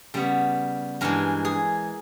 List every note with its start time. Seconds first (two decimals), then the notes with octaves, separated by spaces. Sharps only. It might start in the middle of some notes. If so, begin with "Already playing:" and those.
0.14 C#3 G3 B3
1.01 G2 E3 G#3 A#4
1.45 G#4